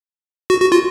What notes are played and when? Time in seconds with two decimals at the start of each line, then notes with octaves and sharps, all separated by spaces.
0.50 F#4
0.61 F#4
0.72 F4